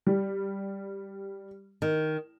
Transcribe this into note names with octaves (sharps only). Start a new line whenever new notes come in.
G3
D#3